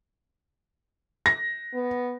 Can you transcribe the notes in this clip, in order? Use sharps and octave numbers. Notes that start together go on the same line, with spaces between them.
A#6
B3